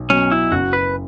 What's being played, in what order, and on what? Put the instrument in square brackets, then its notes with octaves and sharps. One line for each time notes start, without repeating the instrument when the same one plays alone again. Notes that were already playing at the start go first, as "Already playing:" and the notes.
Already playing: [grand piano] B1
[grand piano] B2 F#3 [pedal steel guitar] C#4
[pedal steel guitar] E4
[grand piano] F#1 [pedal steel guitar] F#4
[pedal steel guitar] B4